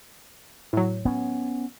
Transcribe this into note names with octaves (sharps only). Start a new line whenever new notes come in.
A2 F#3
B3 C#4